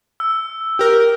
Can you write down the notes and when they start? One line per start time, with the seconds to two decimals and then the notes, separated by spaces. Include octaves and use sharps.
0.20 E6
0.79 G4 A#4